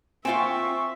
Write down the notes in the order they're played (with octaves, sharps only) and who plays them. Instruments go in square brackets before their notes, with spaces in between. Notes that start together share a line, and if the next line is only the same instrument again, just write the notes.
[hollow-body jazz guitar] C4 F4 [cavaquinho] C5 G5 G#5 [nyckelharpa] E5 [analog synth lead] C#6